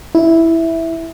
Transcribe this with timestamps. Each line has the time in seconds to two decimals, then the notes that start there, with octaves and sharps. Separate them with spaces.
0.15 E4